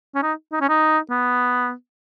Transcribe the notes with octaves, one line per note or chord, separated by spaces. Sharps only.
C#4
D#4
D#4
C#4
D#4
B3